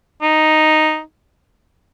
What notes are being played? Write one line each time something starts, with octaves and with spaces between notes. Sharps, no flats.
D#4